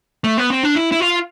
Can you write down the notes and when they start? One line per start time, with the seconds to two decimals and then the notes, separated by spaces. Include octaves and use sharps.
0.24 A3
0.38 B3
0.50 C4
0.63 D4
0.76 E4
0.92 E4
1.00 F4